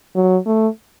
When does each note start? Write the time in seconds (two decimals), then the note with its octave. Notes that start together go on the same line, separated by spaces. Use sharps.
0.15 F#3
0.46 A3